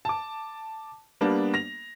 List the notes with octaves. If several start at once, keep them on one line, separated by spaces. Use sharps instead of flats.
A5 D6
G3 A#3 B3 D4
A#6 F7